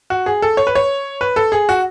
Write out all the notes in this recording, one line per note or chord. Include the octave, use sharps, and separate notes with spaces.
F#4
G#4
A4
C#5
B4
C#5
B4
A4
G#4
F#4